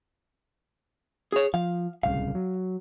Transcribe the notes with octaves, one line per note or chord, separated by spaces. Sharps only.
G#4 C#5
F3 F5
D1 C2 C#3 F5
F#3